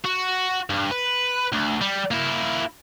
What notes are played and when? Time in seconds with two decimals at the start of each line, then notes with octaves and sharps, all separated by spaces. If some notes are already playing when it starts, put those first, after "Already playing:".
0.05 F#4
0.70 G2
0.91 B4
1.53 D2
1.81 G3
2.11 A#3 E4